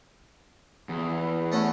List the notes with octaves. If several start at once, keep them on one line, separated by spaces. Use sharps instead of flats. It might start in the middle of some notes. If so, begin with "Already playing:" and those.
E2
A3 C#4 F#4